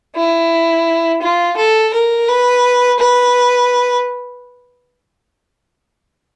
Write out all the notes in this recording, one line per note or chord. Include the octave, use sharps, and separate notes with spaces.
E4
F4
A4
A#4
B4
B4